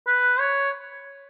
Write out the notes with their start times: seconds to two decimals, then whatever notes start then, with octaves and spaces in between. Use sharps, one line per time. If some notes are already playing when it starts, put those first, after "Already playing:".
0.07 B4
0.40 C#5